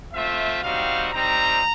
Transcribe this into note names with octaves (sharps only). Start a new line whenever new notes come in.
A3 C4 F4 E5
G3 C4 D#4 F#4 F5
G3 C4 D#4 A#5